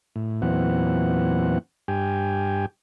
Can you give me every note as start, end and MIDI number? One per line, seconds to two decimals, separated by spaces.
0.16 0.41 45
0.42 1.58 40
0.42 1.58 46
0.42 1.58 52
0.42 1.58 54
0.42 1.58 60
0.42 1.58 78
1.88 2.66 43
1.88 2.66 67
1.88 2.66 79
1.88 2.66 80